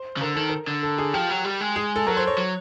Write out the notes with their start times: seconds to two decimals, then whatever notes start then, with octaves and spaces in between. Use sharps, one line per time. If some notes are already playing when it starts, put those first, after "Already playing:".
Already playing: C5
0.17 C#3
0.21 D3 A#4
0.34 D#3 A4
0.49 A#4
0.67 D3
0.83 A4
0.98 G#4
1.13 F3 G4
1.30 F#3
1.45 G3
1.60 G#3
1.76 G#4
1.96 A4
2.06 F#3 A#4
2.17 C5
2.27 C#5
2.38 F#3